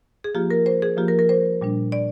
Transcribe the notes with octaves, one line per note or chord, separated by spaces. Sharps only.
G#4
F3 A#3 F4 G4
A#4
C5
G#4
F3 A#3 F4 G4
A#4
A#4
C5
A#2 G3 D4
D5